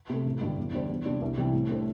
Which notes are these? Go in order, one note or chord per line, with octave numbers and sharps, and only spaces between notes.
C3 A3
A1
G2 D3 G3
E2
D3 G3 D4 C5
E2
C3 G3 D4
C2
C3 E3 G3 C4
A2
A3 D4 A4 C5